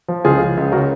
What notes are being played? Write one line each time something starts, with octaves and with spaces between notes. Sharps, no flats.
F3
C#2 F4 G#4
C#2
C#2
C#3 F#4 A#4